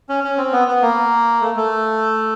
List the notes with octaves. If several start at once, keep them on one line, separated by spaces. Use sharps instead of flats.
C#4
C#4
C4
B3
B3
A#3
A3
A3